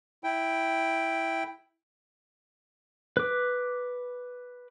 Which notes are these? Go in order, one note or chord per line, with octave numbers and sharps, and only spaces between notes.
E4 G5
B4 D6